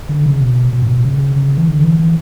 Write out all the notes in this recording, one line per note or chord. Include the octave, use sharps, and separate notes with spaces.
D3
C#3
B2
B2
A2
B2
C#3
C#3
E3
D3
E3
E3